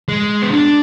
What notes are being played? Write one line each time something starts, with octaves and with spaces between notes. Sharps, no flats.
G#3
B3
D4